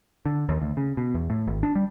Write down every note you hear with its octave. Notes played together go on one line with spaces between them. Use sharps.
D3
D#2
D2
C#3
B2
E2
A2
G#1
D4
G3